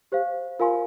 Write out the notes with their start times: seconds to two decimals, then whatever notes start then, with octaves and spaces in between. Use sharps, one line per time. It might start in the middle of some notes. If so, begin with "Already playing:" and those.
0.12 G4 C5 F5
0.59 F4 A#4 F5 G#5 C6